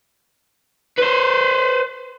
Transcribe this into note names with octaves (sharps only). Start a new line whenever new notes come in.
B4 C5